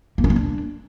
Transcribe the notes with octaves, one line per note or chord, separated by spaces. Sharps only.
A#3
C#4
A#3
D4